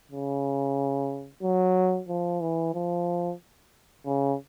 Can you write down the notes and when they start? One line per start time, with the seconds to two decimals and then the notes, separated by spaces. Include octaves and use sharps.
0.12 C#3
1.43 F#3
2.09 F3
2.41 E3
2.74 F3
4.06 C#3